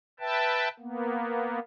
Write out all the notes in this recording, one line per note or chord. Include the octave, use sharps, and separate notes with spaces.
B4 E5 G5 A5
A#3 B3